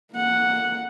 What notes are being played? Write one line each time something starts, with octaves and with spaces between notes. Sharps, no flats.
A#3 F#5